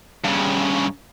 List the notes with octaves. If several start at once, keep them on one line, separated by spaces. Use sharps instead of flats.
G2 C#3